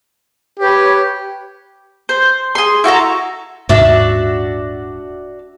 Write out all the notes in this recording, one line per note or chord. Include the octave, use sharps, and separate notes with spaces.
G4 B4 C#5
C5
G#4 C6
E4 F#4 A4 A#5
D#1 G#2 D4 F#4 E5